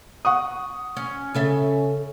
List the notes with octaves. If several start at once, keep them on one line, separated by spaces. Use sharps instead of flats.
F#5 C#6 D#6
C#4
C#3 C#4 A4 E5